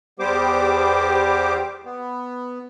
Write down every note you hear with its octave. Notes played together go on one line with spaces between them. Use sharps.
E2 G3 B3 G4 C5 D6
B3